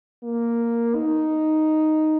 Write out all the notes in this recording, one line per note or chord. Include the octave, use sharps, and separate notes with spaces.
A#3
D#4